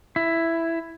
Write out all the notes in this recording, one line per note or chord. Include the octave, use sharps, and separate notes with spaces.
E4